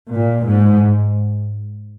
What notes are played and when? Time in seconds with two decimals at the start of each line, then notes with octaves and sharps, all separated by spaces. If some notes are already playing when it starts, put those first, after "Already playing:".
0.12 A#2
0.47 G#2